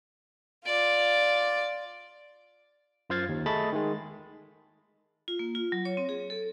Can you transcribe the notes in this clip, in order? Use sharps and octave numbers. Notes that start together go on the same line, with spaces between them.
F4 D5
F#2 F4 C5 F5 G#6 A6
D#2
A3 G#4 D#5 A5 B5 A6
D#3 G#3
F4
A#3
F4
F#3
C#5
C4
G#4
A4